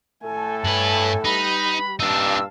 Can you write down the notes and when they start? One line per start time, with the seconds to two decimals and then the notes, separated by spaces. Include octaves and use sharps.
0.23 A2 A3 A4 G#5
0.64 G2 B4 C#5 G#5 F#7
1.25 G3 D#4 B4 B5
1.99 G2 A#2 D4 D#4 F5 A5 E6